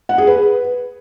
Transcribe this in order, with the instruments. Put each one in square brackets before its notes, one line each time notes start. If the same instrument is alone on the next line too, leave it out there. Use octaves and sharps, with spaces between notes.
[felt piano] F#5
G#4
B4